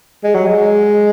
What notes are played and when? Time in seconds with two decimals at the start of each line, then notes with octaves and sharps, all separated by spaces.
0.24 G#3
0.35 F#3
0.46 G#3